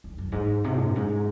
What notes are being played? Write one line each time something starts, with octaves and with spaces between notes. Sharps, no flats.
F2
F#2
G#2
C3
F#2
G#2